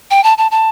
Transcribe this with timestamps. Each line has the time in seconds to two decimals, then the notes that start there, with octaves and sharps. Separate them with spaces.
0.11 G5
0.24 A5
0.38 A5
0.51 A5